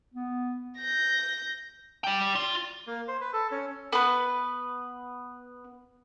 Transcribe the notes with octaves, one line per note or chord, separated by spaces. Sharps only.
B3
G6 A#6
D5 G5
F4
A#3
C5
B4
A4
C#4
B3 B4